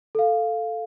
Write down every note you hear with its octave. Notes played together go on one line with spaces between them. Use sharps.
A4 F5